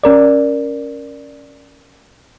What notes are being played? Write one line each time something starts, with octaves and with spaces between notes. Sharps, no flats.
C#4 A#4 D5